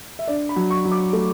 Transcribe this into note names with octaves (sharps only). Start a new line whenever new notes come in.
E5
D4 D5
B5
F#3
C#6
F#3
D6
A3